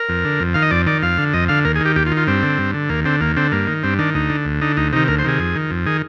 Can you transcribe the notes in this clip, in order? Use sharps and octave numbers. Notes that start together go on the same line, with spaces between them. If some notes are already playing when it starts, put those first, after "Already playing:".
Already playing: A#4
F2
D3
F2
D#3 F5
D#5
F2 D5
D#3 D5
F2 F5
D3
F2 D#5
D3 F5
D#2 A#4
G#4
D#3 G4
D#2 G4
F4
D#3
F4
G2 C4
D3
G2
D3
D#2 A#3
D3 C4
D#2 A#3
D3 C4
G2 A#3
D#3
G2 C4
D#3 D4
D2 D#4
D3
D2
D3 D#4
D2 D#4
C3 D#3 D#4
D2 A#4
C5
C3 D#3 G#4
F2
D#3
F2
D#3 G#4